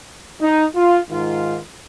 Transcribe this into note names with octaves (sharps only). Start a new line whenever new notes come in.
D#4
F4
G#2 D#3 F4